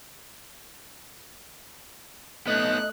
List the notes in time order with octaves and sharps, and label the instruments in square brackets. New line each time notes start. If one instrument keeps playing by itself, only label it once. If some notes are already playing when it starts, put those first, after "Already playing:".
[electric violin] A3 F#6 [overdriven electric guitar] B3 D#4 [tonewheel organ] D#5